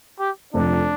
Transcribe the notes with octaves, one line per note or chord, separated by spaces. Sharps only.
G4
F1 F2 F3 D4